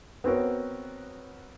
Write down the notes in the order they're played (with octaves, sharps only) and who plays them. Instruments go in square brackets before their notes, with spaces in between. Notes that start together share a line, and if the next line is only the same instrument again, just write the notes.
[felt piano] B3 C4 F#4 A#4 C#5